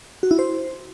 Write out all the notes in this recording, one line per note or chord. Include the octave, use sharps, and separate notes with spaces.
F#4
E4
C5